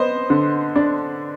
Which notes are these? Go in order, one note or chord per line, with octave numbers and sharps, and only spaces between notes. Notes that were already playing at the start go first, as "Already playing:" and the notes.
Already playing: B3 C5 D#5
D3
D4